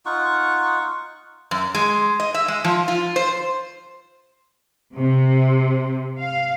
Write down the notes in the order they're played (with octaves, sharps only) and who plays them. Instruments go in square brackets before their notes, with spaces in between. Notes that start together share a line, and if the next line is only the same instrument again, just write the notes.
[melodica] D#4 F4 F#5 C#6
[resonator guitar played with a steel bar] F#2
G#3
D#5
E5
G#3
F3
F4
C5
[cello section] C3
F5